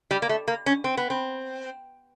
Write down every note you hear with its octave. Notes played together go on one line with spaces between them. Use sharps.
G3
A#3
A3
A#3
C#4
C4
B3
C4